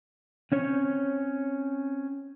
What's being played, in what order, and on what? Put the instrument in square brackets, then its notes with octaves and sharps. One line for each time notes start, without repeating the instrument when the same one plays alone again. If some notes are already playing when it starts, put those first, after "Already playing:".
[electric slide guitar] C4 C#4 C#5